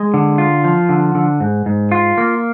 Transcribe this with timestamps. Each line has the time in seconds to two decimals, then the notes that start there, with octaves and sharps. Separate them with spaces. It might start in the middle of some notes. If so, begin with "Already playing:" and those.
Already playing: G#3
0.14 D3
0.38 F4
0.64 F3
0.89 D3
1.15 D3
1.40 G#2
1.66 G#2
1.92 F4
2.18 A#3